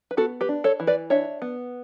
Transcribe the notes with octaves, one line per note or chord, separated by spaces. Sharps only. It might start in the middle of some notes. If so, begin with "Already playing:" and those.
B4
B3 F#4 A4
G4 B4
D4
A4 C#5
E3
B4 D5
D4 C#5 E5
B3